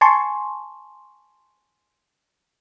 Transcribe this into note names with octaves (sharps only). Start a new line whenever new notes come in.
G#5 A5 C6 C#6